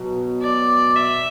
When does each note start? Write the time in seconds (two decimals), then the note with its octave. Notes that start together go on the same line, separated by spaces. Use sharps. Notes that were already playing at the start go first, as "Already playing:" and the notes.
Already playing: B2 F#3
0.42 D5
0.95 E5